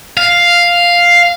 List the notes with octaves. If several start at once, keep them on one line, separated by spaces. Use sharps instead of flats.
F5